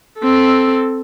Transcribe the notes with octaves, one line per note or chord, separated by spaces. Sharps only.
C4 A4